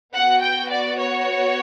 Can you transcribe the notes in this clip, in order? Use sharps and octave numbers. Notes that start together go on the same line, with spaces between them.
B3 F#4 F#5
G5
D5
C#5